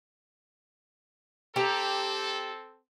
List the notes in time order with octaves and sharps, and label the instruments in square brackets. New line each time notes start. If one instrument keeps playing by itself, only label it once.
[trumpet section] C4 A4 [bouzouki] G4 A#5